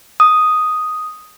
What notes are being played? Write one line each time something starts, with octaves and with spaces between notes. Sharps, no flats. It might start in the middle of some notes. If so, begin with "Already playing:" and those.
D#6